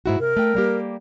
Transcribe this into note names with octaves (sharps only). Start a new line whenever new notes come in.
G#2 E4 F#4
C3 A#4
A3 G5
G3 A#3 G4